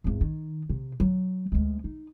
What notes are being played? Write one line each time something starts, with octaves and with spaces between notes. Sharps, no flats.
G#1 E2
D#3
C3
F#3
D2 G#3
D#4